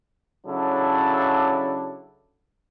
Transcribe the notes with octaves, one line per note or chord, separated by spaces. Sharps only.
C#3 F#3 D4 E4 A4